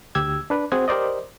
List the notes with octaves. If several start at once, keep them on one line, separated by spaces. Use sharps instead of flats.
D2 G4 E6 G#6
D4 B4
C4 F#4 G#4 C5 F#5 G#5
G4 A#4 C5 D5 D#5